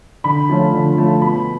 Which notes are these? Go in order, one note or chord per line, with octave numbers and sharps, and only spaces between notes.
D3 B5
F3 A3 C#4 F4
D3
F3 A3 C#4 F4
B2 B5